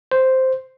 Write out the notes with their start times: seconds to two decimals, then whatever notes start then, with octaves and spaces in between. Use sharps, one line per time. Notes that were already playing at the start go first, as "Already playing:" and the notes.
0.12 C5